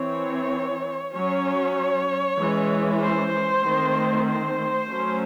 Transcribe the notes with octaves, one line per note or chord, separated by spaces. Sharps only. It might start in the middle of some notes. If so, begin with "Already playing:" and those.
Already playing: E3 C4 C#5
F#3 C#4 C#5
E3 G#3 C#4
C5
D#3 A3 C4
C5
F#3 A3 C#4